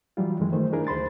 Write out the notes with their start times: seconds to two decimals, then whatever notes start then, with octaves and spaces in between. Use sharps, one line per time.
0.17 E3 F#3 G3 F4
0.39 F#2 D#3 E3 G#3
0.53 D#3 A3 C5
0.73 D4 E4 G#4 A#4
0.87 D2 C5 B5 C6 A6